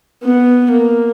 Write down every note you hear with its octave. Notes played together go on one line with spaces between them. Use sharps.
B3
A#3